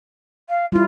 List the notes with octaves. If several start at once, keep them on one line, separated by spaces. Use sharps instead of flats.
F5
G3 E4 F4